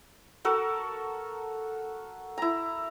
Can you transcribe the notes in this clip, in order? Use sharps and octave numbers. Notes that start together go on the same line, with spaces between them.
F#4 A4 A#4
E4 A#5